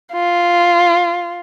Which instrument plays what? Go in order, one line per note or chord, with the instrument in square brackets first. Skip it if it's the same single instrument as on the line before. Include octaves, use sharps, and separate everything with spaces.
[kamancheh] F4